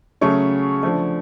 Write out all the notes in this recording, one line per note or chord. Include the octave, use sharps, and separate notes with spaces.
C#3 F#3 A3 C#4 C#6
D3 F3 A3